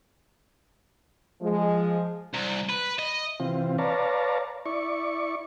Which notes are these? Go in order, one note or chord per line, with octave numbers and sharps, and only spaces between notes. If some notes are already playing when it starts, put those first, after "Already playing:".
F3 G#3
C2
B4
D#5
C3 E3 C4 F4
B4 C#5 D5 F5 A5 A#5
E4 D5 C#6